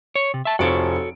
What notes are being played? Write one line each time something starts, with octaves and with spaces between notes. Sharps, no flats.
C#5
C3
E5 A5
F1 F3 F#4 A4 C#5 D7